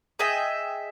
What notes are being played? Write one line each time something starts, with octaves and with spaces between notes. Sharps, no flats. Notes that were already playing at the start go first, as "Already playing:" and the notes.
G#4 D#5 E5 G5